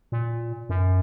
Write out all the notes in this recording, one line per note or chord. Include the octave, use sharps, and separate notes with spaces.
A#2
F#2